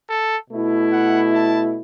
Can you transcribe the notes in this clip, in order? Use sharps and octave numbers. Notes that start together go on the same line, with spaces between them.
A4
B2 A3 E4
F#5
A5